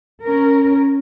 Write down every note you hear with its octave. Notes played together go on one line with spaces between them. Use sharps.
C#4 A#4